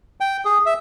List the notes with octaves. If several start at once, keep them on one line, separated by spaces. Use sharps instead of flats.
G5
G#4
E5